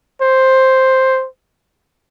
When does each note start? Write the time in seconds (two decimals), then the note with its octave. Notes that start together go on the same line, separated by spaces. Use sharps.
0.21 C5